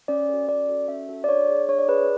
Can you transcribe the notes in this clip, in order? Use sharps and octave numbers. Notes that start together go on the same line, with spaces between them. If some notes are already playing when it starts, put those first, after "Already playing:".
C#4 D5
F#4 A4
C#4 D5
F#4 A4
C#4 E5
F#4 A4
D5
D4 C#5
G#4
D4 C#5
D5
G#4 B4